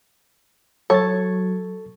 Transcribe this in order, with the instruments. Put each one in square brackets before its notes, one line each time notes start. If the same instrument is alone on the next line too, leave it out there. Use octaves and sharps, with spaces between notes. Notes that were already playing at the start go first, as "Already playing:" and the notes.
[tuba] F#3 [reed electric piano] A4 C#6 A6 [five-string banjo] C#5